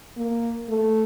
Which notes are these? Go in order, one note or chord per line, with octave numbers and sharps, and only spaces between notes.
A#3
A3